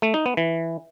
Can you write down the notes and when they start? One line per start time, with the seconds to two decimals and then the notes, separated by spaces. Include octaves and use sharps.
0.02 A3
0.14 D#4
0.26 B3
0.37 E3